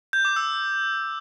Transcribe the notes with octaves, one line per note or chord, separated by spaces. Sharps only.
G6
D6
E6